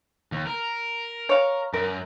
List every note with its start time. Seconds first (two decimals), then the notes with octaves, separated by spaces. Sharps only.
0.32 D#2
0.47 A#4
1.29 C#5 F5
1.74 F#2 A#4